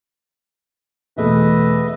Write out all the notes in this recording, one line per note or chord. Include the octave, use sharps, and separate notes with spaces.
E2 B2 A3 B4 D#5 E5